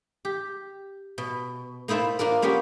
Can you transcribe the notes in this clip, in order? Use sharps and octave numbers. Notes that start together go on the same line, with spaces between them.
G4
B2
A#3 D#4 E4 C5 A5
A#3 D4 F4 A#4
A#3 B3 C#4 G4